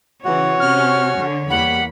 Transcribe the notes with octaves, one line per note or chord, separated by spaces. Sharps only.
C#3 E3 F#4 C#5
C3 C#4 F6
D3
E2 G3 A#3 F#5 B5